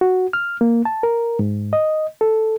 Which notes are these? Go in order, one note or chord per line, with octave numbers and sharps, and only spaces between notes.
F#4
F6
A#3
A5
A#4
G#2
D#5
A4